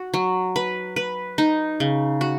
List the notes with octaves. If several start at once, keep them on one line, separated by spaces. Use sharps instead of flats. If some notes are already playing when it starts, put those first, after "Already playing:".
Already playing: F#4
F#3
B4
B4
D#4
C#3
F#4